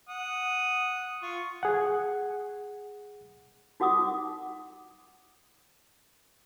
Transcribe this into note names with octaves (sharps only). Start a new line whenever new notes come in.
F#5 D#6
F4 C#6
G#4 F#5
D#4 F#4 F#5 D6 D#6